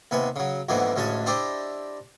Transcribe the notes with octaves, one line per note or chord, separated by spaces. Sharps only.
D#2 C3 B3 G#5
C#3 F#3
F2 G#2 D3 E3 A#3 B3
A1 D2 G#3 C#4 G#5 A5
D4 E4 G4 C5 D5 D#5